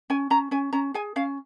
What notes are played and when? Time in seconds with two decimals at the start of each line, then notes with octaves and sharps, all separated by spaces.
0.10 C#4 G#5
0.30 C#4 A#5
0.51 C#4 G#5
0.73 C#4 A#5
0.94 G#4 G#5
1.16 C#4 F5